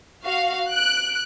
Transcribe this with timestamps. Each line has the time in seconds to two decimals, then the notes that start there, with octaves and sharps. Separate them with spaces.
0.24 F#4 F5
0.68 F#6 D7